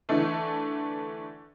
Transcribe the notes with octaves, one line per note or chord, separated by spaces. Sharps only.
D3 E3 A3